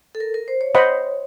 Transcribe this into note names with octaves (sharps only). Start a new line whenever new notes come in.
A4
A#4
A#4
C5
C#5
C5 D#5 F#5 B5